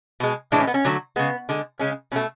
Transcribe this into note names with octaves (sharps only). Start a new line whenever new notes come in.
B2 G#3
A2 E3 G#3 D4
C#4
B3
C#4
D3 F#3 A3
C#3 G#3 B3
D3 G#3
C#3 G#3 C#4
B2 A3 C#4